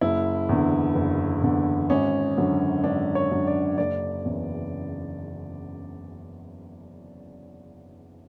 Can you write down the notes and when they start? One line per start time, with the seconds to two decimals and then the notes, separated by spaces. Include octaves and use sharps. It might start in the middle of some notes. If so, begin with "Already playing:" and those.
0.01 F#1 E4
0.49 E2 D3
0.95 F#1
1.43 E2 D3
1.90 G#1 C#4
2.37 F#2 D3
2.84 G#1 D4
3.15 C#5
3.31 F#2 D3
3.47 D5
3.78 F#1 D5
4.25 E2 C#3 E3